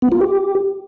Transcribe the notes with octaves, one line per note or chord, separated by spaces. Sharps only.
B3
F4
G4